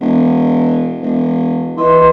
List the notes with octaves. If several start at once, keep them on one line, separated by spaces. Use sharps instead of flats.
E1
E1
E3 B4 D#5 C6